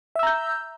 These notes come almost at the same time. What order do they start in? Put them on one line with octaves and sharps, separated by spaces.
E5 E6 A#5 G6